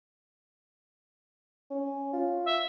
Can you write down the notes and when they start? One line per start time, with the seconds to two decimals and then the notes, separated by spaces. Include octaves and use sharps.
1.70 C#4
2.13 F4
2.46 E5